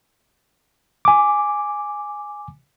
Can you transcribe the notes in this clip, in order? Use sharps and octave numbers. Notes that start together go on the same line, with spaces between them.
G#5 D6